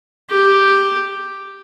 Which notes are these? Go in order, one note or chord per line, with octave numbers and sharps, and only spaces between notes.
G4